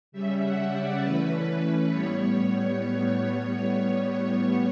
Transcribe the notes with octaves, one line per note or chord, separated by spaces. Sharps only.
C#3 G3 C#4 E5
F#5
D5
E3 A3 C#4 B4
B4
B4
A2 G3 B3 C#5